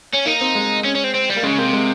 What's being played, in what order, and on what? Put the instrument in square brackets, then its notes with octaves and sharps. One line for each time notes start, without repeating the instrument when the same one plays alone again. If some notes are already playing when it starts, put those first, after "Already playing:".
[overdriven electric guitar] C#4
[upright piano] A#3 [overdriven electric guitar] D#4
[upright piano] C4
G#3
[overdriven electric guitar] C#4
C#4
C4
C4
G3
[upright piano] A#3
[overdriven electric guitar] C#3 [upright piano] G#3
[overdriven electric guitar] C3 [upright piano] A#3
[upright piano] G#3